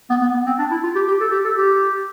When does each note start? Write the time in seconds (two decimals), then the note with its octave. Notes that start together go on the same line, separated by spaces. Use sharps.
0.10 B3
0.21 B3
0.34 B3
0.46 C4
0.59 D4
0.71 E4
0.83 F4
0.95 G4
1.08 G4
1.20 A4
1.32 G4
1.44 A4
1.57 G4